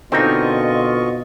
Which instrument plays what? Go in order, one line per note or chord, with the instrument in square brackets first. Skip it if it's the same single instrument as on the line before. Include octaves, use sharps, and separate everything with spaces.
[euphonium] B2 [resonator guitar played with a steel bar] D3 A#3 [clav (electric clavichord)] C4 D#4 [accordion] F4 D#5 C#6